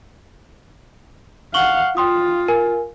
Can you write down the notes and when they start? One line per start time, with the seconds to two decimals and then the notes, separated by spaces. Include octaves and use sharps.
1.54 F5 F#5 C#6 F#7 G7
1.97 F4 G5 C6 D#6
2.48 A#4 G#5